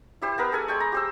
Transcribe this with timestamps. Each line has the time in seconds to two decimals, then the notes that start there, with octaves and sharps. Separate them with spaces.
0.22 E4 G4 C5
0.38 B3 A#4 B4
0.52 G#4 A4 G#5
0.68 G#3 G5 C#6
0.80 A#5
0.92 G4 C5 E6